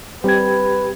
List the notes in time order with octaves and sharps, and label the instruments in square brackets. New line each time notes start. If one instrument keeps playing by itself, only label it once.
[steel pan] G3 C4 [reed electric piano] G4 G#6 [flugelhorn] B4